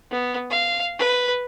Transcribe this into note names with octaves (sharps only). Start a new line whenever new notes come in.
B3
F5
B4